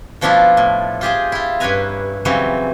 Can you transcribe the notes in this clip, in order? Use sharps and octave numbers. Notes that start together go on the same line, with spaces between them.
B2 F3 A3 D4 E4 F4
A2
F4 G4 G#4 C5
E4 F4
G2 C#4 E4 B4 G#5 A#5
C#3 E3 F#3 G3 C4